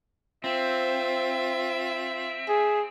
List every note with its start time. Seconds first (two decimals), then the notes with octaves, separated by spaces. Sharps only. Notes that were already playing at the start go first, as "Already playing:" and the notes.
0.44 C4 F4 E5
2.49 G#4